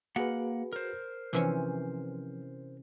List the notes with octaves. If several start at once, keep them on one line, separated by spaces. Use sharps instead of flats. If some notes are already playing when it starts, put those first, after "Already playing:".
A#3 F#4 G#4 B4 F#5
A#4 C5
C3 E3 F3 C#4